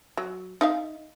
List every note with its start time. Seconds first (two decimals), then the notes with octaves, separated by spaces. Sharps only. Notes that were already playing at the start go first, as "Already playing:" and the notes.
0.17 F#3
0.61 D#4 E5 F5